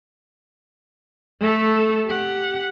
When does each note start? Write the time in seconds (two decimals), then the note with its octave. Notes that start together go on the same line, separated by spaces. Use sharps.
1.40 A3 A4
2.06 G4 F#5